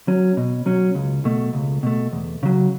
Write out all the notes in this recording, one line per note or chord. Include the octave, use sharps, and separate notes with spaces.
F#3 C#4
B2
F#3 C#4
C#2
B2 A3
C#2
B2 A3
E2
C#3 F#3